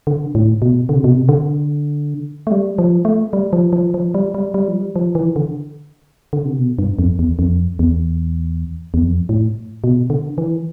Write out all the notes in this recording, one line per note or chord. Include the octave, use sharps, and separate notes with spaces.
D3
A2
B2
D3
C3
B2
C3
D3
A3
G3
F3
A3
G3
F3
F3
F3
G3
G3
G3
F3
G3
F3
E3
D3
D3
C3
B2
G2
F2
E2
F2
E2
E2
F2
A2
B2
D3
E3